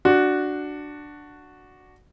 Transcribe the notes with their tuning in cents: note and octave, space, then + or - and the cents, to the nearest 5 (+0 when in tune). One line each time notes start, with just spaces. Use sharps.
D4 +5 F#4 +0